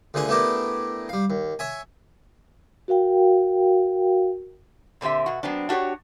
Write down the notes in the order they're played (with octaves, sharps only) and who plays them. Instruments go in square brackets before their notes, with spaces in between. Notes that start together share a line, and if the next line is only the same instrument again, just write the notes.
[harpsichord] D2 A#2 D3 G#4 F#5 G#5
A3 B3 D4 E4 G4 A#4
G3 F5
D#2
C#5 E5 G#5
[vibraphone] F#4 A#4 F5 G5
[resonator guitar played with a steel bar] A#2 D3 C4 G4 E5
B2 F#4
F#3 B3 C4 D4
D4 F#4 G4 C5 C#5